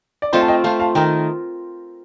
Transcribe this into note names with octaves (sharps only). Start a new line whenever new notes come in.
D5
A3 C4 F4 C5 D#5
A5
D#5 G5
A3 C4 F4 F5 A5
F5 A5
D#3 A3 D#4 A#4 G5 A#5